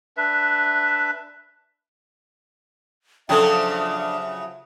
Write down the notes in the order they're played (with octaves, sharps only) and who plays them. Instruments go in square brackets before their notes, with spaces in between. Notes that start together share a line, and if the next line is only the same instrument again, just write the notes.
[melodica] D4 B4 E5
[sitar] C#3 F3 F#3 [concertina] D4 [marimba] A4 G5 [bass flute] E5